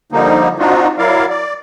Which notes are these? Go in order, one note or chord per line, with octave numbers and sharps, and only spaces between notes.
D3 F3 G3 A#3 D#4
C4 D4 D#4 F4 F#4
F#3 E4 A#4 D5 F5
D5